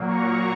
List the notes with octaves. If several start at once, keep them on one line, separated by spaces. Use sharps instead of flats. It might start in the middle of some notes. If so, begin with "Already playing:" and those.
Already playing: A#2 F#3 A#3
A#5 C#6